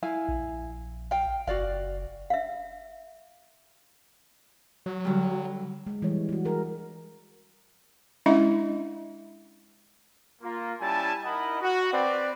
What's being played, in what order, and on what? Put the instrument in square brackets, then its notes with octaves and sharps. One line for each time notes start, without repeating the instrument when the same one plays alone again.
[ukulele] E4 F5 G#5
[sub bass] A#1
[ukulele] F5 G5
[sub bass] F#1 [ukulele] F#4 D5 F5
[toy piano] E5 F5
[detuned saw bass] F#3
[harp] D3 G3
[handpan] G#3
E3 G3 C#5
E3 F#4
D4 G#4 A#4
[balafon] G#3 C#4 D4 E4 D#5 E5
[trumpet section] A#3 F4
G3 C#4 E4 G#5 A5
D#4 E4 A#4 D#5 F#5 B5
F#4
C4 B4 D5